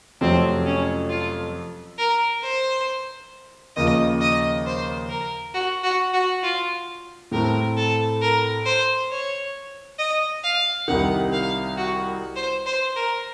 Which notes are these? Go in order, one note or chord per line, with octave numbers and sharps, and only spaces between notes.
F2 C3 F#3 A3 C4
C#4
F4
A#4
C5
D#2 C#3 F3 D#5
D#5
C5
A#4
F#4
F#4
F#4
F4
A2 A3 C4 A#4
A4
A#4
C5
C#5
D#5
F5
C2 C3 D#3 F#5
F5
F#4
C5
C5
A#4